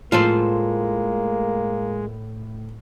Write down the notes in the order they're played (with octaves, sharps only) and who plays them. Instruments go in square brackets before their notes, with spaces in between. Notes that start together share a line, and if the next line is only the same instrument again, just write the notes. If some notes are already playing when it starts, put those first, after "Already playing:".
[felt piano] A2 [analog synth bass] G#3 [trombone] A#3 [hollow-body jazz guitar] F4 A4 C5